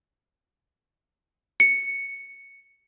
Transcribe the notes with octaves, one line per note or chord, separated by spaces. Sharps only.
C#7